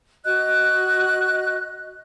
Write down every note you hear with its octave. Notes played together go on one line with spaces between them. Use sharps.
F#4 D#5 F#6